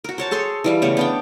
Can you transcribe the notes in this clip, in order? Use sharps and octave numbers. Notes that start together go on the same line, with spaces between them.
F#4 A#4
C5 C#5 A5
G#4 A4 C#5 C6
E3 G3 F5
C#3 A3 B3 C#5
B3 D4 G5